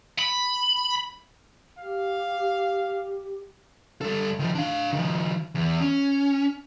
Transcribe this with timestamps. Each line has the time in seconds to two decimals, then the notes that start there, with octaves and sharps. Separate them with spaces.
0.19 B5
1.79 G4 F5
4.01 G3 A4
4.39 D#3 F3
4.55 D4 F5
4.93 D#3 F3
5.55 E2
5.81 C#4